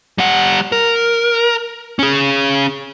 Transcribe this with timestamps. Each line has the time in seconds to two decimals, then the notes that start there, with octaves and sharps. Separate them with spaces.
0.18 G3 F#5
0.72 A#4
1.99 C#4 G#4